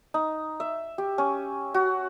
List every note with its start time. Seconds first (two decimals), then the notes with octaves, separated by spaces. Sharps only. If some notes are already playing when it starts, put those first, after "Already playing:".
0.14 D#4
0.60 E5
0.98 G4
1.18 C#4
1.74 F#4